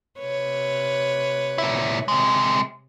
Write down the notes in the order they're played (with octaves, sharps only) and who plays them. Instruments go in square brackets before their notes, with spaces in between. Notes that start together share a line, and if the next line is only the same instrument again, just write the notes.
[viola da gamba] C3 B4 C#5
[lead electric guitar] A#2 E4
C3 G#3